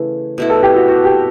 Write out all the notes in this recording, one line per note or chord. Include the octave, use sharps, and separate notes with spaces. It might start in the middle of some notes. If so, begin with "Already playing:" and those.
Already playing: C#3 E3 A3
B2 A3 E4
A4
G4
F#4
F#4
G4